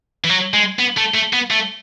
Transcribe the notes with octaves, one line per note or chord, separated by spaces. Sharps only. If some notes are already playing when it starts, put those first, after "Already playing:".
E3
F#3
G#3
B3
A3
A3
B3
A3